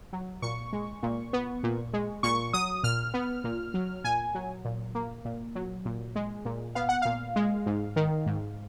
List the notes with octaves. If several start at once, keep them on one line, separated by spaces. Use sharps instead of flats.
F#3
A#2 C#6
G#3
A#2
B3
A#2
G#3
A#2 C#6
F#3 D#6
A#2 F6
B3
A#2
F#3
A#2 G#5
F#3
A#2
A#3
A#2
F#3
A#2
G#3
A#2
B3 F5
F#5
A#2 F5
G#3
G#2
D#3
G#2